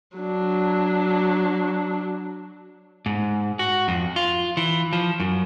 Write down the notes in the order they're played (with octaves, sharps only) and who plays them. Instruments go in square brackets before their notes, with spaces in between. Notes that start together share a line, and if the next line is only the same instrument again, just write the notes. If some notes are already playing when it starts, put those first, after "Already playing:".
[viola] F#3 D4
[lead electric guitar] G#2
F#4
F2
F4
E3
F3
F#2